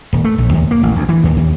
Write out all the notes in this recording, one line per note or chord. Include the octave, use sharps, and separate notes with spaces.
D#1
A3
A#1
D#2
A#3
A1
D2
E3
D#2
D#2